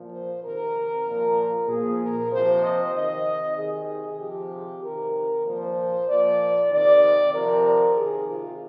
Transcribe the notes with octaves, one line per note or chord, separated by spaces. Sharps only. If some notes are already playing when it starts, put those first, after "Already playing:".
Already playing: A#2 F3
C5
C3 D#3 A#4
A#2 F3
A#2 F3 G#4
A#4
C3 F3 C5
D#5
C3 D#3 D#5
C3 D#3 G#4
C3 F3 G4
C3 D#3 A#4
A#2 F3 C5
A#2 F3 D5
C3 D#3 D5
C3 F3 A#4
C3 D#3 G#4
F4